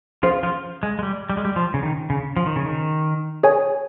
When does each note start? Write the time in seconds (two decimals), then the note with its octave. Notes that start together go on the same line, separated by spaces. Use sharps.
0.23 F3 C#4 F4 G#4 C5 F5
0.43 F3 F4
0.83 G#3
0.99 G#3
1.03 G3
1.30 G3
1.37 G#3
1.45 G3
1.56 F3
1.74 C#3
1.83 D#3
2.10 C#3
2.36 F3
2.46 D#3
2.56 C#3
2.66 D#3
3.43 G#4 C#5 G#5